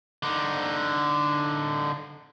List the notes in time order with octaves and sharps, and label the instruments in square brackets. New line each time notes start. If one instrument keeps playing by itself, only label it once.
[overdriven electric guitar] D3 D#4